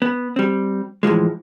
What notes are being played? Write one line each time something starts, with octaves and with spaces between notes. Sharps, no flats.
B3
G3 C4
A2 E3 F3 G#3